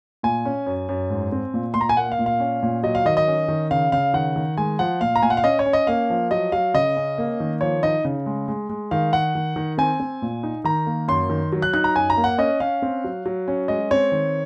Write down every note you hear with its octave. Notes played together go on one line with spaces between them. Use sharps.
A#2 G#5
C#4
F#2
F#2
G#2
C4
A#2
A#2 C6
A#5
G#5
A#3 F#5
F5
A#2
F5
C#4
A#2
F#3 D#5
F5
D#3 D#5
D#5
C#4
D#3
C#3 F5
C#3 F5
D#3 F#5
D#3
G#3 G#5
F3 F#5
A#2 F5
A#5
A#2 G#5
F#5
F5
C#4 D#5
C#5
C#4
D#5
A#3 F5
F3
F#3 D#5
F#3 F5
C#3 D#5
C#4
A#3
D#3
F3 C#5
D#4 D#5
C#3
G#3
G#3
G#3
D#3 F5
D#3 F#5
D#3
D#3
C4 G#5
C4
A#2
D#4
D#3 A#5
A#3
F#2 C6
D#3
F#3
F#6
D#4 F#6
A#5
F#2 G#5
A#5
A#3
F#5
C#4 D#5
C#4 F5
C4
F#3
F#3
C#4
G#3 D#5
C4 C#5
D#3